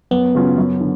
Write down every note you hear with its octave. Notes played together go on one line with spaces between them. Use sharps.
F#2 B3
C#3 F#3 C#4 F4
F#2
D3